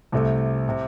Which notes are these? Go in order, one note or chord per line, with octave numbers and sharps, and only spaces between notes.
C2 C3 A3
C3